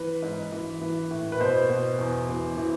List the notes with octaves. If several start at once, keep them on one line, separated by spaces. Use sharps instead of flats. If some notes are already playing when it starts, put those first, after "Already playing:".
Already playing: E3 B4
G#2
E3
E3
A2
B4
B2 C5
B2
E2
E3
E3